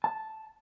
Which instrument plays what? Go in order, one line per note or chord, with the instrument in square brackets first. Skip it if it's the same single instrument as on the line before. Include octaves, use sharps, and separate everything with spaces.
[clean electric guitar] A5